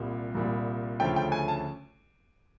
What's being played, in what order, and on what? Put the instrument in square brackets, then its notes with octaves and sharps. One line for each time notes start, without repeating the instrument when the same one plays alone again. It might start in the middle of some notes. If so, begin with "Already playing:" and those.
Already playing: [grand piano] C2 A#2 G3
C2 A#2 G3
D2 C#3 F3 A3 C#4 G5
G5
G#5
A5